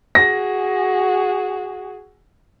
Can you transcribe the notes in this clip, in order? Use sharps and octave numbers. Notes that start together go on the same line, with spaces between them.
F#4 G#4 A#6